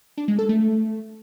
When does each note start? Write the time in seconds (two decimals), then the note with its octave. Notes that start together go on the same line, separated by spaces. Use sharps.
0.17 D4
0.28 G#3
0.39 A4
0.49 A3